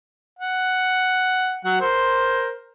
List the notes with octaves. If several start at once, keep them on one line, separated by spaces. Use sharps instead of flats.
F#5
F#3 F#5
A#4 C5